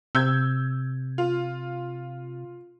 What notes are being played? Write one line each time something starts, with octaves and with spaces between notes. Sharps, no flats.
C3 E6 G6 G#6
F4